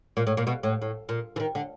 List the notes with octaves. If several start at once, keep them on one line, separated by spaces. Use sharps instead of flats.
A#2
A2
A#2
B2
A2
A2
A#2
E3
D#3
D3